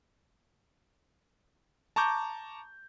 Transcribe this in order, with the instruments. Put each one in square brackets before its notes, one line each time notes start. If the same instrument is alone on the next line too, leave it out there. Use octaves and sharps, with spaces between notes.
[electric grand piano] A5 A#5 C#6 D6 G6